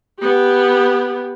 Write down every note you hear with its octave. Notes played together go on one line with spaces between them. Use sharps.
B3 G4